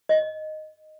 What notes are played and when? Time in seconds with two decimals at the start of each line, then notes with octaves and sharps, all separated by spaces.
0.09 D#5